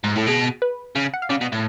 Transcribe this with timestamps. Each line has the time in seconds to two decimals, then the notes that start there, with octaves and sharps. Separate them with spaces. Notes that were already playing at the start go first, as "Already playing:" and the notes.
0.04 G#2
0.16 A2 A4
0.27 B2 G#4
0.62 B4
0.95 C#3
1.14 F#5
1.22 F5
1.29 C#3 D5
1.41 B2
1.52 A2